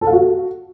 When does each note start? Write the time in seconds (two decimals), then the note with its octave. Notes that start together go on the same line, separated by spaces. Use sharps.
0.01 A4
0.07 F5
0.12 F#4